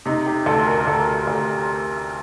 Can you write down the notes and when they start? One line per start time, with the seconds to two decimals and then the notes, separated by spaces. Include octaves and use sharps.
0.06 C3 D#4
0.26 G4
0.46 D2 A4
0.67 A#4
0.87 D2 A4
1.27 D2